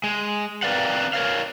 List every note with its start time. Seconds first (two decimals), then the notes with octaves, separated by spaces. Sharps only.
0.04 G#3
0.63 C4 A#4 B4 D5 F5 F#5
1.13 A#4 C#5 F5